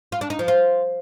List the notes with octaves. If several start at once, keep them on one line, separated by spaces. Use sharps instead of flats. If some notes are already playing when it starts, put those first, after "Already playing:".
F4
D4
D#4
F3
F4